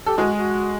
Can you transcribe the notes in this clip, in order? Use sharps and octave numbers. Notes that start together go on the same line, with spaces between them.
G4 A4
G#3 F#4 G#4
F#4